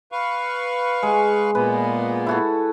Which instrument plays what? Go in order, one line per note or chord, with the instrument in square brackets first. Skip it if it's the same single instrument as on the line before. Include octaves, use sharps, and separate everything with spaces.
[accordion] B4 F5 C#6
[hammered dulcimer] G#3
[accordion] A#2 A#3 B3 [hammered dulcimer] B4
[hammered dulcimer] E4 F#4 A4